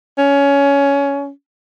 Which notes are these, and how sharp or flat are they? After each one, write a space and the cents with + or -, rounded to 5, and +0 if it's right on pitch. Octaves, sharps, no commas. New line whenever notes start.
C#4 +20